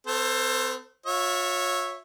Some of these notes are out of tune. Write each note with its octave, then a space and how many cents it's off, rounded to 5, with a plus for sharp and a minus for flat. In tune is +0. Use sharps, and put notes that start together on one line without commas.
C4 -40 A4 +20 C5 +25
F4 +40 C#5 -10 E5 +0